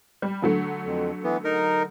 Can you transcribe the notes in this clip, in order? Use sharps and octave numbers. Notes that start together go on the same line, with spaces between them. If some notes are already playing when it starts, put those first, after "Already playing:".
G3
D3 F#3 A3
F2
E3 B3
D#4 A#4